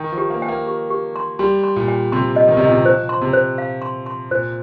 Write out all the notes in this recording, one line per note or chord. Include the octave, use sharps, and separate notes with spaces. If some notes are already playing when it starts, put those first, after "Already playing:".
Already playing: D#3 G5
F3
G4
A#3
G5
A#3
G4
G4
C6
G3 C6
C6
A#2
G5
C3 C6
D#5
D#3
C3
A#2 D#5
C3
F3 C5
C6
C3
C5
F5
C6
C6
A#2 C5